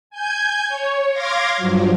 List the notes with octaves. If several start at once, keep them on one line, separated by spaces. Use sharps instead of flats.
G#5 G6 G#6
C#5
F5 C6 D6 G#6 A#6
G2 F3 F#3